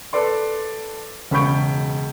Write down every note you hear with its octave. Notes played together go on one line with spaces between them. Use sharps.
A4 B4 D5 C6
E1 C#3 B5 C#6 G6 D7